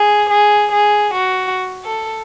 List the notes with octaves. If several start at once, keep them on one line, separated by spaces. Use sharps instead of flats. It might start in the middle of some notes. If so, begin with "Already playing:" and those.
Already playing: G#4
G#4
G#4
F#4
A4